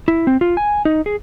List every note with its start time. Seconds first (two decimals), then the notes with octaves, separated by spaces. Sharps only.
0.08 E4
0.27 C4
0.41 F4
0.57 G#5
0.85 D#4
1.06 G#4